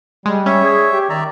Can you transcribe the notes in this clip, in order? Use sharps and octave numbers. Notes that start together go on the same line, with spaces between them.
G3 G#3
C#4 C#5 E5
G#4
G4
D#3 D5 E5 A#5